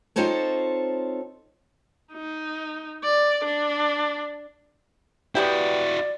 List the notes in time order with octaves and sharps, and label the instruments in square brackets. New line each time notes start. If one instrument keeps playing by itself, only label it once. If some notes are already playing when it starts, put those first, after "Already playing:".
[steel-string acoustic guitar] C4 D#4 F4 A4 C5 C#5
[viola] D#4
D5
D4
[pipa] B3 G4 G5 [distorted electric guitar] E4 F#4 [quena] D5